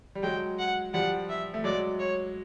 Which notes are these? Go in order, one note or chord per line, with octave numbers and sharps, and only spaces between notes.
G3
F#3 G#3 G5
F#5
F3 G3 F#5
E5
A3
F#3 G#3 D5
C#5